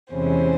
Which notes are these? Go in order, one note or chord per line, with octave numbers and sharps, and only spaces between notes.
E2 C3 E3 G#3 C#4 C5